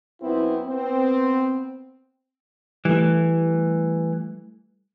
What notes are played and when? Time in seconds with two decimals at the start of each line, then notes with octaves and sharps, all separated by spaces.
0.22 F#2 B3 C4 E4
0.67 B3 C4
2.85 E3 G3 A3